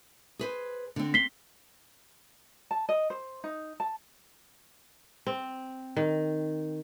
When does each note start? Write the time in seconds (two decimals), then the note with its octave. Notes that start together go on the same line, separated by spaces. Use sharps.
0.39 G#4 B4 C5
0.96 D3 C4
1.14 C4 B6 C7 G7
2.71 A5
2.89 D#5
3.10 C5
3.44 D#4
3.80 A5
5.27 C4
5.97 D#3